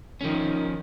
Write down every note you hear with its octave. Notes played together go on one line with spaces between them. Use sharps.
D#3 F3 C#4